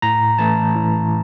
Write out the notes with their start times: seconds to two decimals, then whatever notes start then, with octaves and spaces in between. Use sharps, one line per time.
0.02 A2 A#5
0.38 E3 A3 A5
0.75 A2